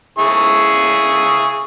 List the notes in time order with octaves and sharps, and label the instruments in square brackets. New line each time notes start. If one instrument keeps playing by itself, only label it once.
[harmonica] E4 G#4 C#6